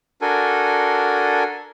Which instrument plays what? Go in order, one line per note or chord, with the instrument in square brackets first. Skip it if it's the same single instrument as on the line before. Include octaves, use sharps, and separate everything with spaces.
[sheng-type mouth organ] D4 F#4 A4 A#4 G#5